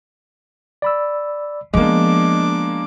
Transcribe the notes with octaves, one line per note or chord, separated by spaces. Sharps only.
D5 B5 E6
F3 G#3 A#3 B3 D4 D#5 D6